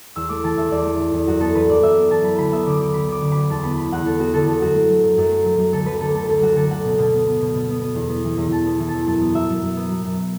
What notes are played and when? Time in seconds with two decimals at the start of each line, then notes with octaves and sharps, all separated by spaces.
0.16 E2 E6
0.29 A3 D6
0.44 E3 A5
0.57 E2 E5
0.71 E2 D5
0.85 A3
1.00 E3
1.13 E2
1.27 F#2 F#4
1.40 B3 A4
1.55 E3 B4
1.69 F#2 D5
1.82 F#2 E5
1.97 B3
2.10 E3 A5
2.24 F#2 B5
2.38 D2 B5
2.52 B3 E5
2.66 D3 D6
2.81 D2 D6
2.94 D2 B5
3.08 B3 D6
3.22 D3
3.32 D2 B5
3.50 E2 A5
3.63 B3 B5
3.77 D3 B5
3.92 E2 F#5
4.06 E2 A4
4.19 B3 F#4
4.34 D3 A4
4.47 E2 A4
4.61 F#2 F#4
4.75 A3
4.89 F#3
5.03 F#2
5.18 F#2
5.31 A3
5.45 F#3
5.59 F#2
5.73 D2 A4
5.86 F#3 B4
6.00 D3 A4
6.15 A3 A4
6.29 D2 A4
6.42 F#3 F#4
6.56 D3 A4
6.71 A3 F#5
6.84 B2
6.98 B2
7.13 B3
7.26 B3
7.41 B2
7.54 B2
7.69 B3
7.81 B3
7.95 E2
8.09 B3
8.24 E3
8.38 E2
8.51 E2 A5
8.66 B3
8.80 E3
8.88 A5
8.94 E2
9.07 F#2 A5
9.21 B3
9.34 F#3 E5
9.49 F#2
9.63 F#2
9.76 B3
9.91 F#3
10.05 F#2